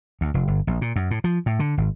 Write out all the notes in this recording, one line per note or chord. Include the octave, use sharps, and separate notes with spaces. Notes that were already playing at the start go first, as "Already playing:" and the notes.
D2
F1
G1
A#1
A#2
F#2
A2
F3
A2
D3
G#1